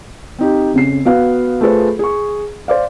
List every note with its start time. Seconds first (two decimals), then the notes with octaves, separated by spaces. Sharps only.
0.39 C4 D#4 G4
0.74 F2 C#3 C7
1.05 B3 F#4 F5
1.61 A3 F4 G#4 A4 B4 C5
1.99 G#4 C#6
2.68 C5 D5 F5